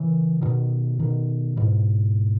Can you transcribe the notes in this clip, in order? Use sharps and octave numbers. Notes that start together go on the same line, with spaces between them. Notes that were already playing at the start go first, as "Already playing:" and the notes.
Already playing: C#3 E3
B2 D#3
B2 D#3
G#2 B2